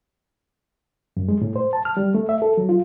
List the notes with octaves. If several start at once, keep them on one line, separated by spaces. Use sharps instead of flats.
F#2
G#3
A2
C5
A5
F6
G3
A3
E5
A4
F#3
F4